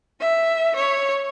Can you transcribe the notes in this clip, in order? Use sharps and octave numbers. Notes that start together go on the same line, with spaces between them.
E5
C#5